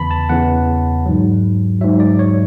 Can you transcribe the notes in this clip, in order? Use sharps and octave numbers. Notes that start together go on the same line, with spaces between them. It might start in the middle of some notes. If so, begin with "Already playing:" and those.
Already playing: E2 C#3 E3 A5 B5
A5
E2 C#3 E3 F#5
G#2 F#3
G#2 F#3 E5
D5
C#5